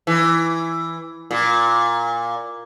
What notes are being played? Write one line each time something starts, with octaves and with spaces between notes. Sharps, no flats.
E3
A#2